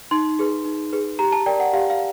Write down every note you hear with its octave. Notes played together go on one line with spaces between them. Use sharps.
D#4 C6
G#4 B4
D#4
G#4 B4
G4 A#5
A5
A#4 D5 G5
F#5
G4 F5
F5